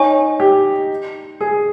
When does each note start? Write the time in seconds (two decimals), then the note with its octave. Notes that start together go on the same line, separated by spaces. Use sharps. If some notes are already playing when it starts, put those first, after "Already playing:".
Already playing: D#4 C#5 G#5 C#6
0.40 G4
1.41 G#4